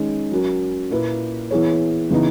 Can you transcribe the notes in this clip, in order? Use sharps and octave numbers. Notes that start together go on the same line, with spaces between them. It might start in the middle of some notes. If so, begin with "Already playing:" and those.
Already playing: D#3 G#3 C#4
F#3 C#4 F#4 A#4
A#2 A#3 E4 B4
E3 B3 E4 G#4 C#5
C#3 E3 B3 D#4